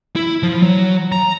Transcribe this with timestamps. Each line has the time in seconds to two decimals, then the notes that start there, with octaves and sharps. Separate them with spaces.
0.16 E4
0.43 F3
0.63 F#3
1.12 A#5